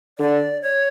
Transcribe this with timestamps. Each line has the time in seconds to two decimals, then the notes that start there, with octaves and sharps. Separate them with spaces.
0.19 D3 D5
0.62 C#5